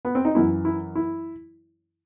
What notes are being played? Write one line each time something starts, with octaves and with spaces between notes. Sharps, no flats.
B3
C4
D#4
F#2 E3 E4
E4
E4